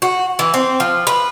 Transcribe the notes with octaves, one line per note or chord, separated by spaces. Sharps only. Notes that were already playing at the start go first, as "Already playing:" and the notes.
F#4
E3
C4
F3
B4